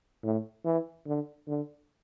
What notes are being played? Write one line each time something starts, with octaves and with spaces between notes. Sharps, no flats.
A2
E3
D3
D3